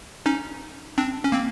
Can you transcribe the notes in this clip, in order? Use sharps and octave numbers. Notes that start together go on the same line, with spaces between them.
C#4 D#4
C4 D4
C#4
A#3 C4